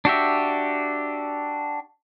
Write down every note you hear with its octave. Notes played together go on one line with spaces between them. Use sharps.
D4 F#4 G4 E5